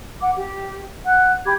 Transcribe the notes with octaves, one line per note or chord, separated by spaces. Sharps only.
F#5 D6
G4
F#5 F#6
G4 B5 D6 G#6